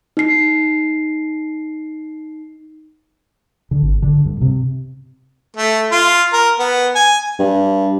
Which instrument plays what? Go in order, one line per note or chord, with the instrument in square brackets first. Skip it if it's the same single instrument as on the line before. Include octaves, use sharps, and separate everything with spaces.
[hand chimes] D#4 C7
[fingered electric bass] D3
G#1
D3
G2
C3
[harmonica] A3
F4
A#4
B3
G#5
[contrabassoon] G2